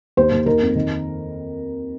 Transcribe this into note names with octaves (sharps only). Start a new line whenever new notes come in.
D#2 C5
D#2
D#3 A#4
F2
D#3